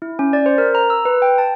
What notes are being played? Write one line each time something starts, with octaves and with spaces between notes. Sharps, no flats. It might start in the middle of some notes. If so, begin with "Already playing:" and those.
E4
C#4
D5
C5
A#4
A#5
E6
B4
G5
A5